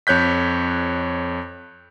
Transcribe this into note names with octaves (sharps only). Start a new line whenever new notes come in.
F2 C#5 F#6 G6 B6